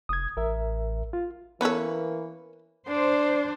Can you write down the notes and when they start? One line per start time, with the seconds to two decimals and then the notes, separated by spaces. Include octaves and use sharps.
0.09 F1 D#6 G#6
0.37 A1 A#4 E5
1.13 F4
1.61 E3 A#3 B3 C#4 A4 B4 C#5
2.88 D4 C5